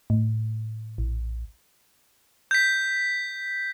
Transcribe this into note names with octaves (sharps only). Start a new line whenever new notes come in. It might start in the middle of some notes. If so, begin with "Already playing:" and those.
A2
A#1
G6 B6